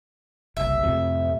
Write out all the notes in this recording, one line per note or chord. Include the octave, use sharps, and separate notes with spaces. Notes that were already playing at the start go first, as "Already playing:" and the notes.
F#1 C2 E5
F2 A2 C3